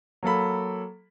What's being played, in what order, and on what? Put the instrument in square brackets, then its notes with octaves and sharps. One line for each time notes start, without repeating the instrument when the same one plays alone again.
[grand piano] F#3 A#3 A4 B5